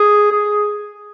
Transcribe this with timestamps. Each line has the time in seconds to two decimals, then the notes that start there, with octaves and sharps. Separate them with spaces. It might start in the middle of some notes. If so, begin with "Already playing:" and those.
Already playing: G#4
0.32 G#4